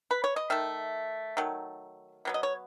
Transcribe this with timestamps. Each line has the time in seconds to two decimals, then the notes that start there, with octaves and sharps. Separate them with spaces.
0.11 B4
0.24 C#5
0.36 D#5
0.50 D#3 A3 E5
1.37 D#3 F#3 A3
2.25 B2 F#3 B3
2.34 D#5
2.43 C#5